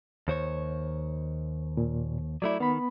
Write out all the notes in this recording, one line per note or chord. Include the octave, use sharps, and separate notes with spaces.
D#2 C5 C#5
A#2
F#3 A3 E4 D5
D#3 B3 B5